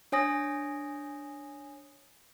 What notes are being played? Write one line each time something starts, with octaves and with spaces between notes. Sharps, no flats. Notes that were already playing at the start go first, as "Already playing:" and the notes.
D4 C#5 G#5 D#6 A#6